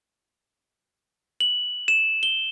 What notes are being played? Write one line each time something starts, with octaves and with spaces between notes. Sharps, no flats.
F#7
E7
G7